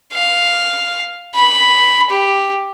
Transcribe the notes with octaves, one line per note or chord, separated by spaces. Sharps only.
F5
B5
G4